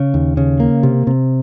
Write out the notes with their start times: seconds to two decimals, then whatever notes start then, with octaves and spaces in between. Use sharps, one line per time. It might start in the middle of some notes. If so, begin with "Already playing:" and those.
Already playing: C#3
0.14 D#2
0.37 C#3
0.60 A#3
0.83 C3
1.07 C3